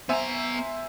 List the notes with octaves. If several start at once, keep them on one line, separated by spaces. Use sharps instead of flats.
B3 C5 E5 G#5 A#5